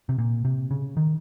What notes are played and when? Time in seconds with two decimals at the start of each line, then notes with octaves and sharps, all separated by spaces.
0.09 C3
0.18 A#2
0.45 C3
0.71 C#3
0.97 D#3